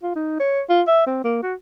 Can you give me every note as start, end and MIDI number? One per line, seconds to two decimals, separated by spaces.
0.03 0.12 65
0.15 0.38 63
0.40 0.61 73
0.69 0.82 65
0.87 1.03 76
1.06 1.19 60
1.24 1.41 58
1.42 1.54 66